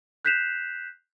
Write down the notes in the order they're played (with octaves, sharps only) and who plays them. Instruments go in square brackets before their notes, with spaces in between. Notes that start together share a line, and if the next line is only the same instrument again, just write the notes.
[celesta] F#6 G6 B6 C7 E7 F7